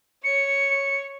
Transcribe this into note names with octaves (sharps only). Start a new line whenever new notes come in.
C#5 C#7